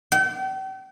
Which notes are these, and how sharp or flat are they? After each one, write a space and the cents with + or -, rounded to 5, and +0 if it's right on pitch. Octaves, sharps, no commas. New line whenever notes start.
G5 -40